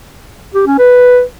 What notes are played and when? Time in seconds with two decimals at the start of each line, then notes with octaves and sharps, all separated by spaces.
0.55 G4
0.67 C#4
0.78 B4